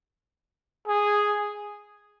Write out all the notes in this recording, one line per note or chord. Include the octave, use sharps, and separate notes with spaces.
G#4